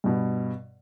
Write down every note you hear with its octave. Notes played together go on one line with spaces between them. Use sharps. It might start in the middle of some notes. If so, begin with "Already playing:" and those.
G2 B2